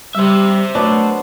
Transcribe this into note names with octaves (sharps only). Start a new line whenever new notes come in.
G3 C5 E5
F#3 A3 B3 D4